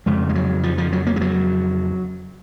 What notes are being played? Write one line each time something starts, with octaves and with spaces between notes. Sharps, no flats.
F2 C#3 G#3
G#3
F#3
F3
F3
F#3
A#3
G#3
F#3